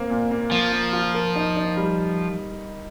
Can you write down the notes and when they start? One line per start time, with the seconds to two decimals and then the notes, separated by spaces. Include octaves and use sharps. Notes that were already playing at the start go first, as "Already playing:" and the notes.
Already playing: A#3 C4
0.10 A#2
0.31 A#3
0.51 F3 A#3
0.72 A#3
0.93 F4
1.14 A#4
1.36 D#4
1.56 D#4
1.77 G3